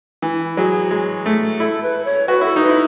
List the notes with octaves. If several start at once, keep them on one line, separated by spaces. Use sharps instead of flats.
E3
F#3 G#4
G#3
A3
E4 A4
B4
C#5
F#4 B4
E4 A4
D#4
B4
E4